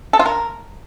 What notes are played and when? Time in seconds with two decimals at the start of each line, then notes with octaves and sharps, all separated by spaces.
0.13 A4
0.19 F4
0.26 A#4